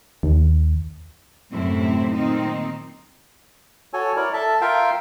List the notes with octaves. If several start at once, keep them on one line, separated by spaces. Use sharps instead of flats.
D#2
F#2 A2 C3 A3 C4 E4
A#2 D#3 C4 D#4
F#4 A4 C#5 G#5
E4 A#4 C#5 D5
A4 E5 A5
F4 A#4 E5 F5 G5